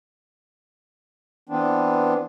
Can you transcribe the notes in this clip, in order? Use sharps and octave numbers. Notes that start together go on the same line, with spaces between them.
E3 B3 C4 D4